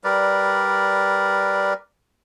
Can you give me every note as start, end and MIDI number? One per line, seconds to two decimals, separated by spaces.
0.04 1.74 55
0.04 1.74 70
0.04 1.74 71
0.04 1.74 74